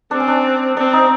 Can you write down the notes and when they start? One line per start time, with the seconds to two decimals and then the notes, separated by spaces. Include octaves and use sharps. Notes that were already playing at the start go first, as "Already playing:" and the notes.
0.11 C4 D4
0.20 C#4
0.28 D4
0.77 C4 D4
0.93 D#4